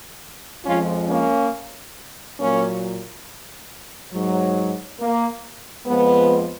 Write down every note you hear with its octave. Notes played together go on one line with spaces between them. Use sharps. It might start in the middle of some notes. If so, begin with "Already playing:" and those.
F2 F3 G#3 C#4 F4
A#3 C#4
A#2 F#3 A#3 C#4
G#2 F#3
A#3
F2 F3 G#3 B3